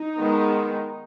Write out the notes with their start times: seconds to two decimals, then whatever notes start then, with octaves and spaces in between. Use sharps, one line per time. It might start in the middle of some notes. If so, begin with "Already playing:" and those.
Already playing: D#4
0.19 D#3 G#3 B3